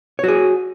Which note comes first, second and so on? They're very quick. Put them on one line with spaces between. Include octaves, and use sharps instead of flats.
C#5 F#4 G#4